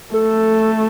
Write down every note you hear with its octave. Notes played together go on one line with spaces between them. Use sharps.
A3 A4